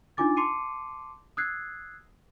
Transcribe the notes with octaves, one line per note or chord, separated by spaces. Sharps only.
D4 D#4 F4 G#5 D6 A6
A5 C6 D6 C7 C#7 D#7
D#6 E6 F#6 G#6 C7